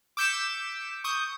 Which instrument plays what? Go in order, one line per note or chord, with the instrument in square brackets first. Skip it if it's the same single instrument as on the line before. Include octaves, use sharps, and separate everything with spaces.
[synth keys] D6 E6 G6 B6 C#7 E7
C#6 D#6 G6